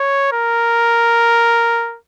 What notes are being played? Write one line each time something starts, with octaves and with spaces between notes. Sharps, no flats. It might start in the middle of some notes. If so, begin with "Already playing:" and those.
Already playing: C#5
A#4